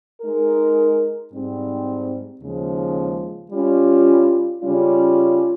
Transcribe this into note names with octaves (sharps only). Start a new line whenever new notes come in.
G#3 D#4 A#4
G#2 G3 C4
D#2 C#3 F3 G#3
G3 C#4 F4
C#3 G3 C#4 F4